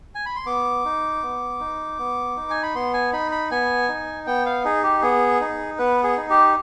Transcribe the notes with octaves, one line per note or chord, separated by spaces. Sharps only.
G#5
B5
C6
B3 D6
D#4
B3
D#4
B3
D#4
G#5
B5
B3 C6
G#5
D#4 B5
B5
B3 G#5
D#4
B3 G5
F5
D#4 G#4
G4
B3 G#4
D#4
B3 B4
G#4
D#4
G4